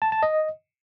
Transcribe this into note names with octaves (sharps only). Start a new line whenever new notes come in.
A5
A5
D#5